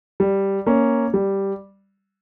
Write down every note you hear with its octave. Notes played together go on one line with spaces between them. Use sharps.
G3
A#3 C#4
G3